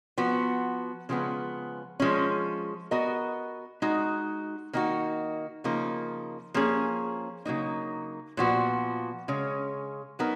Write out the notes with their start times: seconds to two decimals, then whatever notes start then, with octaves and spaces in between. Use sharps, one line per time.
0.18 F3 B3 F#4
1.09 C#3 F3 G#3 B3
2.00 F3 G#3 C#4
2.91 B3 F#4 A#4 D#5
3.82 G#3 D#4 F#4
4.73 D#3 A#3 D#4 F#4
5.64 C#3 F3 A#3 D#4
6.54 F3 A#3 C#4 G#4
7.45 C#3 F#3 A#3 D#4
8.37 A#2 F3 B3 F#4
9.28 C#3 G#3 C#4
10.19 F#3 B3 D#4 A#4